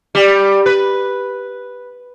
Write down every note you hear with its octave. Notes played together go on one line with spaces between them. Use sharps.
G3
B4